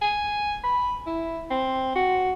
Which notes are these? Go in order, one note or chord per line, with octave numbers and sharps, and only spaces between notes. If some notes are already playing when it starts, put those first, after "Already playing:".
G#5
B5
E4
C4
F#4